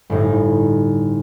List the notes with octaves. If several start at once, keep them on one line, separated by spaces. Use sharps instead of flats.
G1 A2 D#4